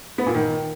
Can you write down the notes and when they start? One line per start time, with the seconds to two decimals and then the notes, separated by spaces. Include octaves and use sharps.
0.18 B3
0.26 A#2
0.34 D#3